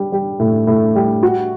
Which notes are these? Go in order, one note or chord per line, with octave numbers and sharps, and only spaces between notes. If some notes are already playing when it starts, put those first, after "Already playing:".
Already playing: G3
G3
A2
A2
G3
F#4